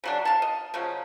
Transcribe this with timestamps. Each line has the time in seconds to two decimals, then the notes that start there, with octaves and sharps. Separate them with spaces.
0.04 C#3 F#3 D4
0.25 F5 A5
0.42 D#5
0.74 C#3 F3 F#3 C#4